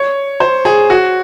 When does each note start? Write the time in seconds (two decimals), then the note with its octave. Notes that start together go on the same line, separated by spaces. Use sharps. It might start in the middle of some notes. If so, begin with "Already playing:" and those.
Already playing: C#5
0.40 C5
0.65 G#4
0.90 F#4